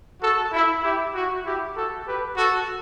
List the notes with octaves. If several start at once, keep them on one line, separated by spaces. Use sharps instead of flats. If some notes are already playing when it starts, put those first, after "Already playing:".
F#4 A4
E4
E4 G4
F#4
E4 G4
F#4 A4
G4 B4
F#4 A4